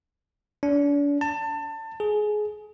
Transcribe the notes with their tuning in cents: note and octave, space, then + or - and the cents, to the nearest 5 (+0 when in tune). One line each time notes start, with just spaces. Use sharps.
D4 -40
A5 +25
G#4 +20